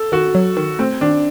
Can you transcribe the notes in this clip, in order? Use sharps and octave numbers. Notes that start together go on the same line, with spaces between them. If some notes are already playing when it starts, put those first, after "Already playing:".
Already playing: A4
D#3 F#4
F#3
D#3
A3 C4
D#3 D4